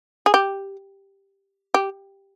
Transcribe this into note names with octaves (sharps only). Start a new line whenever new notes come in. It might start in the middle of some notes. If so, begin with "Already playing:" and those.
G#4
G4
G4